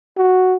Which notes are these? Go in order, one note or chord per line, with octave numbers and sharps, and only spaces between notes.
F#4